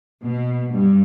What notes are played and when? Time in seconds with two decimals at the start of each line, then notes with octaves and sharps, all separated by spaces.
0.23 B2
0.71 G2